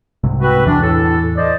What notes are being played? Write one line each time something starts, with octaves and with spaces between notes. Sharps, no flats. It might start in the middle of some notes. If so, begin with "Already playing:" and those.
C2 G#2 C3
C4 F#4 B4
E2 E3 D4
A2 A4
C5 D5 D#5